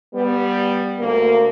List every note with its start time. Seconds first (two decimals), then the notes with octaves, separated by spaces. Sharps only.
0.14 G3 B3
0.99 D2 A#3